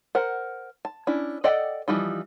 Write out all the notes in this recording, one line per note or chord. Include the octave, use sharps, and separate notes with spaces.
A#4 C5 F#5
A5
C#4 D4 E4
A4 D5 D#5 F#5 G5
E3 F3 G3 D#4